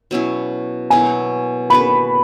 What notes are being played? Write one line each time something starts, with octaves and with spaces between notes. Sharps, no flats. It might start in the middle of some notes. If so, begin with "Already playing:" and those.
B2 F#3 C#4 E4
B2 F#3 E4 G#5
B3 F#4 B4 B5